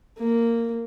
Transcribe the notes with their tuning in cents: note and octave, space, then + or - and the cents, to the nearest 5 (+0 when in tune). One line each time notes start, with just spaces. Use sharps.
A#3 -10